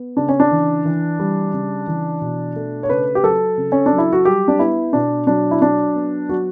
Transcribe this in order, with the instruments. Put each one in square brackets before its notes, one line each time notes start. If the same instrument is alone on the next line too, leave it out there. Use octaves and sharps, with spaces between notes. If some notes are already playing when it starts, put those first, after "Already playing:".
Already playing: [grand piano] B3
C#3 D4
C#4
D4
E3
E3
G3
C#3
E3
B2
A3
C#5
C#3 B4
G4
F#3 A4
C#3
C#4
D4
F#3
E4
F#4
G3 G4
D4
B3 E4
B2 D4
F#3 D4
E4
F#3 D4
B3
F#3 F#4